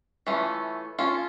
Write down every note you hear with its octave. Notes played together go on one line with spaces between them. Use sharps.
E3 A3 C#4 F4
C#4 F4 A4